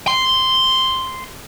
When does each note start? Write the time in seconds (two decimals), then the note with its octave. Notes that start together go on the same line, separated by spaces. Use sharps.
0.08 C6